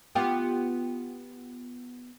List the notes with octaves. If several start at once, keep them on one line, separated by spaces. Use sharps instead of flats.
B3 F4 G4